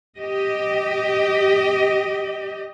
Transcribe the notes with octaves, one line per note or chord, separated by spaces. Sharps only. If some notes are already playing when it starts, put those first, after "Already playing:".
G4 D#5